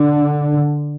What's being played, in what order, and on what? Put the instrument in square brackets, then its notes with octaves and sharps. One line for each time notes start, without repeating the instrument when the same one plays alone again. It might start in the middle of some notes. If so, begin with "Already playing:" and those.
Already playing: [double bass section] D3